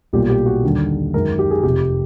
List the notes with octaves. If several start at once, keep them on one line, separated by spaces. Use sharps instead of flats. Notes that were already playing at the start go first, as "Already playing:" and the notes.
B1 A#2 G3 G4
G4
F#4
D#2 D3 G3
F#2 D#3 G#3 A#4
G4
G#4
F1 F2 C3 G4